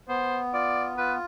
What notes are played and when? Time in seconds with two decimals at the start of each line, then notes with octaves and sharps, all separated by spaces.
0.08 B3 C5
0.54 F4 D5
0.97 F4 B4